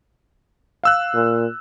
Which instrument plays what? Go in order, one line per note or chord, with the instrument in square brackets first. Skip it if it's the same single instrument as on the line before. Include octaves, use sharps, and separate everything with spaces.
[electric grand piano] F5 E6 F#6
[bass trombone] A#2